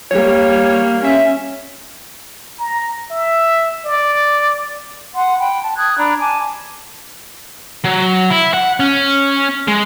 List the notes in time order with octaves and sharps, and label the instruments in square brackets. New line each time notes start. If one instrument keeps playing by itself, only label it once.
[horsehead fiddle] G3 A#3 [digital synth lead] C#5
[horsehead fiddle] C#4 [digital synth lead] E5
[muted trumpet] A#5
E5
D5
[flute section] F#5 C6
G5 B5
A5
D#6 F#6 G#6
D4 A#5 B5
G#5 A5 D6
[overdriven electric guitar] F#3
E4
F#5
C#4
G#3